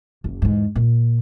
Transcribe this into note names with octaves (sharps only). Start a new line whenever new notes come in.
F#1
E2 G#2
A#2